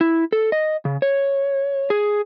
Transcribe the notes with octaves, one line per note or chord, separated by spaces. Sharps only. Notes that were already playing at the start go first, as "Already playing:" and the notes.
E4
A4
D#5
C#3
C#5
G#4